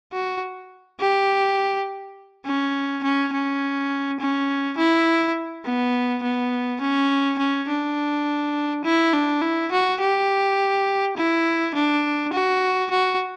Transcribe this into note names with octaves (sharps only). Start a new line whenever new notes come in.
F#4
G4
C#4
C#4
C#4
C#4
E4
B3
B3
C#4
C#4
D4
E4
D4
E4
F#4
G4
E4
D4
F#4
F#4